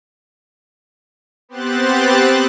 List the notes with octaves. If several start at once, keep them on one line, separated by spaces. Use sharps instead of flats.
B3 C4 G4 C5 F#6 A6